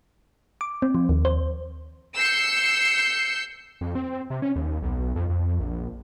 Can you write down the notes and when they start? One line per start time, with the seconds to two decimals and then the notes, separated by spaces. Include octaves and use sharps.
0.61 D6
0.82 C4
0.95 F3
1.09 D#2
1.25 C5
2.17 E6 G6 C7 C#7
3.81 F2
3.95 C4
4.30 C3
4.42 C#4
4.56 D#2
4.82 B1
5.16 F2
5.30 F2
5.60 A#1